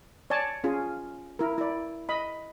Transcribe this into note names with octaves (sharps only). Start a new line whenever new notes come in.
C#5 D5 G#5 A5
C#4 F4 G#4
E4 A#4
E4 D5
D#5 B5